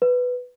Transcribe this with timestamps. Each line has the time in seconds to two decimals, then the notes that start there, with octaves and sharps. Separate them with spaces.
0.02 B4